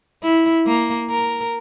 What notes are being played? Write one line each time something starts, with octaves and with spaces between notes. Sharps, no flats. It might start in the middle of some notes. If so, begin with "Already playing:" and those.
E4
A#3
A#4